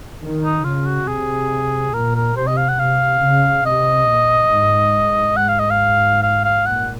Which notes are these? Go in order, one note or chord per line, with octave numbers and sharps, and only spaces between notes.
D#3
D#4
C#3 F4
F#4
C3 G#4
A#2 A#4
A#4
C3 C5
D#5
F5
F#5
C3 F5
C#3
C3 D#5
A#2
G#2
G#2 F#5
F5
D#5
F5
F5
F5
A#2 F#5